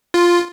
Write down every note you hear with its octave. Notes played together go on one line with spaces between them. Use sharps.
F4